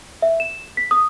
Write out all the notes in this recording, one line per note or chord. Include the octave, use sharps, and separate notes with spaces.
E5
E7
B6
D#6